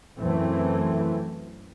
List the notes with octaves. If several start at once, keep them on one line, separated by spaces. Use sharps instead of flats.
F#2 E3 A3 C4